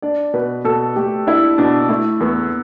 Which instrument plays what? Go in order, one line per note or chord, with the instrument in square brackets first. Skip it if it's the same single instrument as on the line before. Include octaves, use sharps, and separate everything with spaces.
[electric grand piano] D4 [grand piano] D5
[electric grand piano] B2 [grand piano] B4
[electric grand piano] B2 [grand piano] A4
[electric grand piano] A3 [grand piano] G4
[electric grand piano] D4 [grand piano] E4
[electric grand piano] B2 [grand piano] D4
[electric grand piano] A3 [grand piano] E4
[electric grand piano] E2 [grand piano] B3